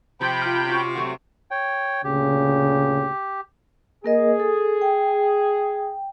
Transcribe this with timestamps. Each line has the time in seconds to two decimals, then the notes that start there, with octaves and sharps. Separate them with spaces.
0.21 C3 F3 G5 B5 G6
0.42 F4 F6
0.65 C#4 F#4
0.95 F#3 A3 F#4
1.51 C#5 G5
2.04 D2 A#2 C#3 G4
4.04 A#3 G#4 A#4 D#5
4.40 A4
4.81 G5